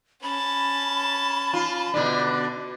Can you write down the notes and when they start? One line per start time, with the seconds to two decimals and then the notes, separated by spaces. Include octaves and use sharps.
0.23 C#4 A5 B5
1.53 F4
1.94 B2 D3 D4